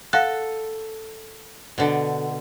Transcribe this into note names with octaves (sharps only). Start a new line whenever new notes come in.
A4 F5 F#5 F#6
B2 D3